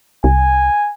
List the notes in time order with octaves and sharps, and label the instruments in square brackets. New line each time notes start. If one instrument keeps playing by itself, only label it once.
[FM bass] C2 [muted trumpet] G#5